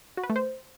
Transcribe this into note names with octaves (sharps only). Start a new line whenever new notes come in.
F#4
B4
A3
C5